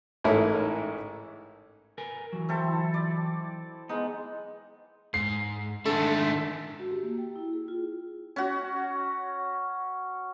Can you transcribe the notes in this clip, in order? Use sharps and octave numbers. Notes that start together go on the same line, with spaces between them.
A1 G#2 A3 E4 A#4 C#5
A#4 B4 G#5
E3 F#3
C4 E4 A4
D5
G#3 B3 D#4
G#2 C7
G#2 D#3 A3 D4 A4
F#4
G4
A#3
G5
E4
G#4
F4
C#4 F#4